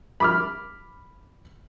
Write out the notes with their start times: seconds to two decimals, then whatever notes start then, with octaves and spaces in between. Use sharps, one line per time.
0.20 B5 D6 F6